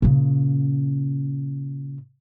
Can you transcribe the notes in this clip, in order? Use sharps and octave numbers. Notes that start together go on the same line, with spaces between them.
A#2 C#3